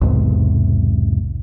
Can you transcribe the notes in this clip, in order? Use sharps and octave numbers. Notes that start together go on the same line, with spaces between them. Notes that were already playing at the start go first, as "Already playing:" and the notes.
B1 E2 G#2 C3